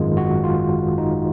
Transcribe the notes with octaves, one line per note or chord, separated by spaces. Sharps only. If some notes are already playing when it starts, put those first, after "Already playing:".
Already playing: G#1 F#2 D#3 G#3 F4
F#4
F4
D#4